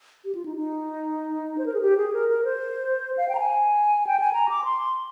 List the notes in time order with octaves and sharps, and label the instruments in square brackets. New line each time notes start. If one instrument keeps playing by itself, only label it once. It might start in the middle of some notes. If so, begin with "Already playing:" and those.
[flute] G4
F4
D#4
D#4
C5
A#4
G#4
G4
G#4
A#4
A#4
C5
F5
G5
A#5
G#5
G5
G#5
A#5
D6
C6